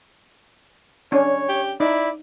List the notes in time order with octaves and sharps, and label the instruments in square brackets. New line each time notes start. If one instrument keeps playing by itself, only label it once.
[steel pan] C#4 D4 [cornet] C#5
[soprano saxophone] G4
[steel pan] D#4 [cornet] E4 [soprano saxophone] D5